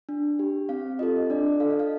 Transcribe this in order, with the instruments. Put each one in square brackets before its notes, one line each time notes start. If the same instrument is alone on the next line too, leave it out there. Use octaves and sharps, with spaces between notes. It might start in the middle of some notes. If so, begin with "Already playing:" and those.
[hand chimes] D4
G4
C4 F5
F4 A4 D#5
D4 D5
A4 F5
D#5
F5